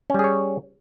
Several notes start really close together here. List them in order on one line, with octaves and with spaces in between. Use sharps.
C#4 G3 G#4 C#5